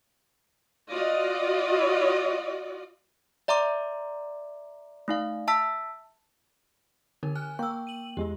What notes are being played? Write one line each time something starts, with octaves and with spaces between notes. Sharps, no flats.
F4 F#4 D5 D#5
D5 E5 A#5 C6 D6
A3 D#4 F5
E5 A5 E6 B6
D3 D#4 A#4
G#5 F6 F#6
A#3 G5 C#6 E6
D#7 F#7
E2 G#3 F4 G4